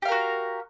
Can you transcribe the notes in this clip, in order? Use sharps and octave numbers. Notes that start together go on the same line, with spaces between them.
F#4 G4 A#4 F5